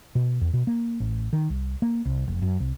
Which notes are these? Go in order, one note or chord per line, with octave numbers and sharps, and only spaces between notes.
B2
E2
B2
A#3
A1
D#3
C2
A#3
C2
F1
F#2
C2